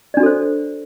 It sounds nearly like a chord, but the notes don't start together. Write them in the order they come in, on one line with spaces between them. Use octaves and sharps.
D5 D4 F#4 A4 C5